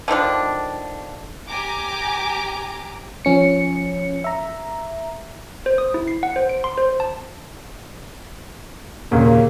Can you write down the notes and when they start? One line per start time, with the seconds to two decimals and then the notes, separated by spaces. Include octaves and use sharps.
0.08 D3 D#3 F3 D4
1.48 G4 G#5 A#5 D6
3.25 F3 C#4 C#7
4.24 E5 A#5
5.66 C5
5.78 D#6
5.94 E4
6.08 C7
6.23 F#5
6.36 C5
6.49 D7
6.64 C6
6.78 C5
7.00 A5
9.12 D#2 A#2 C#3 A#3